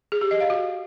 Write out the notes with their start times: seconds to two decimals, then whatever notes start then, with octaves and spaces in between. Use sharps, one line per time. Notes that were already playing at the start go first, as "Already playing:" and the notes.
0.12 G#4
0.21 G4
0.31 D#5
0.40 F5
0.50 F#4